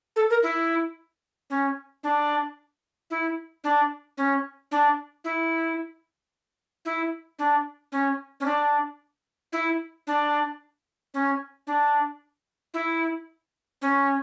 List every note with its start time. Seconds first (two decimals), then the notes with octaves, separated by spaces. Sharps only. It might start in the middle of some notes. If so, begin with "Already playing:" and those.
0.16 A4
0.30 A#4
0.43 E4
1.50 C#4
2.03 D4
3.11 E4
3.64 D4
4.18 C#4
4.71 D4
5.24 E4
6.85 E4
7.39 D4
7.92 C#4
8.40 C#4
8.46 D4
9.53 E4
10.07 D4
11.14 C#4
11.67 D4
12.74 E4
13.82 C#4